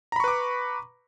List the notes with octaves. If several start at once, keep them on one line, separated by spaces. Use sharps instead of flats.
B4 A#5 B5 C#6 D6